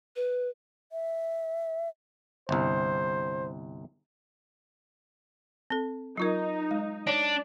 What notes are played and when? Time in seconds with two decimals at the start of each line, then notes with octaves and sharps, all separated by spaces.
0.16 B4
0.92 E5
2.49 G1 C2 C5
5.70 C4 A4
6.17 F#3 D#4 F4 A#4
6.71 G#3
7.07 D4 C#5